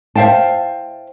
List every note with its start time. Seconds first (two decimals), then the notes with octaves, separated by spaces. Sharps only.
0.16 C5 E5 F5 G5 A5